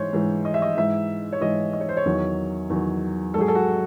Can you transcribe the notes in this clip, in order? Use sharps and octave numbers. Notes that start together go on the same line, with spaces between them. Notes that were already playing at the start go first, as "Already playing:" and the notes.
Already playing: G#2 E3 C5 C#5
G#2 E3
D#5
E5
D#5
G#2 E3 E5
C#5
G#2 E3 D#5
D#5
C#5
C5
C#5
E2 D#3 F#3
E2 D#3 F#3
G#2 F#3 G#4 A4
A4
F#4